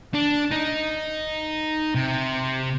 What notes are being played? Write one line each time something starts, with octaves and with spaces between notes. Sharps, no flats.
D4
D#4
C3